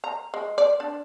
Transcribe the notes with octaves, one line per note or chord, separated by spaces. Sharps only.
A#5
G#3
D5
D4